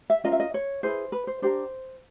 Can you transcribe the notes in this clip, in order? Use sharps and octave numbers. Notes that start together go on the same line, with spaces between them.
E5
C#4 F4 A#4 D#5
E5
D#5
C#5
E4 G#4 B4 C5
B4
C5
D4 G4 A#4 C5